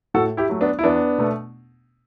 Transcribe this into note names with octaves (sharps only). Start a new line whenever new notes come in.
A2 F#4 A4
E4 G4
F#3 A3
B3 D4
E4
E2 B3 D4
B2 A3